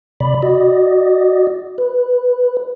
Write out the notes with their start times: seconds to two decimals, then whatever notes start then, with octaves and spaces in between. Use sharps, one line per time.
0.20 C3 D5 B5
0.42 F#4 D5 D#5
1.78 B4